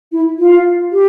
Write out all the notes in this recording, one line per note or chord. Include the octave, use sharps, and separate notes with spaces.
E4
F4
G4